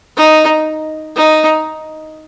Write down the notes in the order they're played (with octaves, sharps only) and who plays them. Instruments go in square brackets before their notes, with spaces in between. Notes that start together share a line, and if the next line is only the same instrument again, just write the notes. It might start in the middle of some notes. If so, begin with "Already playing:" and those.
[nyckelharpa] D#4
D#4